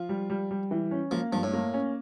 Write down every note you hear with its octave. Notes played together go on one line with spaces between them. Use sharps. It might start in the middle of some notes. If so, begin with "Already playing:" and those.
Already playing: F3 F4
G3
G3
G3
E3
C#4
F3 A#3
G2 F3
A2
A#3
C#4